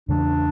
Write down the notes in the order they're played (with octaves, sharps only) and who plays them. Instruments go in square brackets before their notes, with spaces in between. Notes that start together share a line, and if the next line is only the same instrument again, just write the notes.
[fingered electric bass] E2 C#3 E3 A3 [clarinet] D4